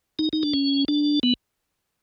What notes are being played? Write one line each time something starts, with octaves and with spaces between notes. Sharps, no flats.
D#4
D#4
D4
C#4
D4
B3